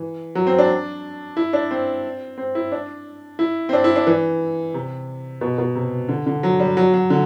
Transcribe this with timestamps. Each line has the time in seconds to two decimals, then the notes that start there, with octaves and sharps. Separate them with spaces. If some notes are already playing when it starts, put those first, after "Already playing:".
Already playing: E3
0.35 F#3
0.47 C4
0.59 D4
1.37 E4
1.53 D4
1.71 C4
2.38 C4
2.55 E4
2.72 D4
3.39 E4
3.69 C4
3.73 D4
3.84 E4
3.96 D4
4.07 E3
4.74 C3
5.41 B2
5.58 B2
5.76 C3
6.09 D3
6.27 D3
6.43 F#3
6.60 G3
6.77 F#3
6.94 F#3
7.10 D3